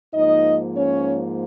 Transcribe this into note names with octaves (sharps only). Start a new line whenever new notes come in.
G#2 F3 A#3 D#4 D#5
C#4 C#5